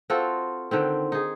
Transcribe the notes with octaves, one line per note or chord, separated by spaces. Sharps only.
C4 F4 F#4 A4
D3 D#3 C4
D#4 G#4